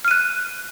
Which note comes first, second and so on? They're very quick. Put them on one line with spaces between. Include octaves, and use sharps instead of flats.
F6 D#7 F#6